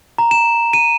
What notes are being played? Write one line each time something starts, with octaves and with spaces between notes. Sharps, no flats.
A#5
E7
D#7